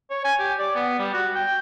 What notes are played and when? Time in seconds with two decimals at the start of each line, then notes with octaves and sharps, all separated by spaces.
0.10 C#5
0.24 G#5
0.39 G4
0.58 D5
0.75 B3
0.98 G3
1.13 F#4
1.35 G5